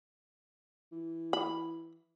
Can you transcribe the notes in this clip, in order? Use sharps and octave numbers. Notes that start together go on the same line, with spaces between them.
E3
B5